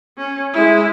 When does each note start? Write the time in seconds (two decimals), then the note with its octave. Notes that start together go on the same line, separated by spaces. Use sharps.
0.18 C#4
0.53 G#3 E4